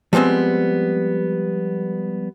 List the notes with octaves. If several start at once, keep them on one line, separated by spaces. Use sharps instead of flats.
F3 G3 G#3 B3 C4